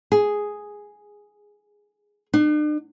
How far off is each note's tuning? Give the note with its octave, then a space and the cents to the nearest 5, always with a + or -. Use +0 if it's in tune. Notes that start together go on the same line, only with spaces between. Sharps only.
G#4 +0
D4 +45